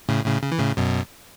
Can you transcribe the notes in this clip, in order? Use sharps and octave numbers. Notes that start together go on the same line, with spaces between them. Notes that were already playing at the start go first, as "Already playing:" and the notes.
A2 C#3
A2 C#3
C#3
E3
A2 C#3
F#2 B2